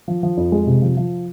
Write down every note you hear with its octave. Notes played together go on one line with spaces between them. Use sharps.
F3
F3
F2
G#3
C3
F3
F3